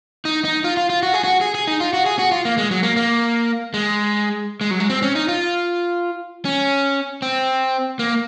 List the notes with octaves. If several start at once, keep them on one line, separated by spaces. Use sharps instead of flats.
D#4
D#4
F4
F4
F4
F#4
G#4
F#4
G#4
G#4
D#4
F4
F#4
G#4
F#4
F4
A#3
G#3
F#3
A#3
A#3
G#3
G#3
F#3
G#3
C4
C#4
D#4
F4
C#4
C4
A#3